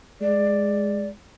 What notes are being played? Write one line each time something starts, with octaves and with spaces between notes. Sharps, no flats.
G#3 D5